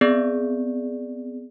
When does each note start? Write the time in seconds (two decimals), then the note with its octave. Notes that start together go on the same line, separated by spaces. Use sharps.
0.01 B3 C4 G#4 D5